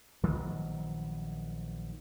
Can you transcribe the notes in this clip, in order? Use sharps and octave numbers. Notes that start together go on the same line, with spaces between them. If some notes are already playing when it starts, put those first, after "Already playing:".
A#1 D#3 F#3 B3